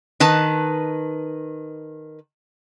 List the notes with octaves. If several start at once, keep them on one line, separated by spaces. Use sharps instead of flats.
D#3 B4 A5